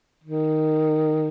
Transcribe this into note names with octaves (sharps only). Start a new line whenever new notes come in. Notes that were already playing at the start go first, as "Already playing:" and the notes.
D#3